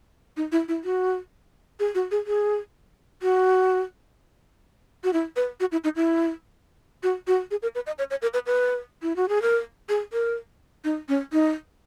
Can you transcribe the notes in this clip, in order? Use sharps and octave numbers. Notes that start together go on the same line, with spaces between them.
D#4
E4
E4
F#4
G#4
F#4
G#4
G#4
F#4
F#4
E4
B4
F#4
E4
D#4
E4
F#4
F#4
G#4
A#4
B4
D#5
C#5
C#5
A#4
B4
B4
E4
F#4
G#4
A#4
G#4
A#4
D#4
C#4
D#4